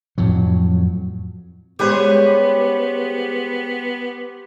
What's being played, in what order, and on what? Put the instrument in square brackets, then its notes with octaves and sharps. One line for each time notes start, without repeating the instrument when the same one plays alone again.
[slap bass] F2 A2 F#3
[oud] G3 G#3 [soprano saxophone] B3 [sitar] C#4 G#4 [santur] G4 B4 C5